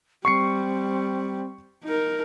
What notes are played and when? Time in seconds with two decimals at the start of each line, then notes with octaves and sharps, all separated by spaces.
0.25 G3 C4 C#6 C7 C#7
1.84 D#4 A#4